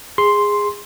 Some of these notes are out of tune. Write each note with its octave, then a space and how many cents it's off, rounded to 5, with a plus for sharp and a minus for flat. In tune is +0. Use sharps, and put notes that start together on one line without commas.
G#4 -15 C6 +0